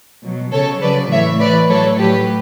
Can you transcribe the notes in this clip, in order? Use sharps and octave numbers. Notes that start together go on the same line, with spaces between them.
B2 F#3
C#3 F#3 A4 C#5
C#3 F#3 B4 D5
A2 E3 C#5 E5
A2 E3 B4 D5
A2 F#3 A4 C#5
A2 F#3 G4 B4